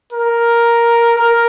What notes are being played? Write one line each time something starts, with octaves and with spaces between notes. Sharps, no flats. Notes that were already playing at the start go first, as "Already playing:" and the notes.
A#4
A#4